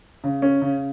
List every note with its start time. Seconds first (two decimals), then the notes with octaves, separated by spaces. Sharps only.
0.24 C#3
0.42 C#4
0.62 C#3